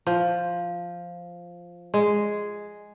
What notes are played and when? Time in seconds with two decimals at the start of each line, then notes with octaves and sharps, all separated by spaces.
0.07 F3
1.94 G#3